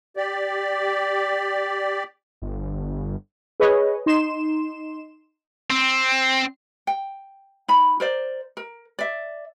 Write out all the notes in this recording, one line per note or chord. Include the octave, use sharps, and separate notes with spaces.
G4 D5
G1
G#4 B4 C#5 D#5
D#4 C6 E7
C4
G5
D#4 B5
A#4 C5 D5
A#4
D5 E5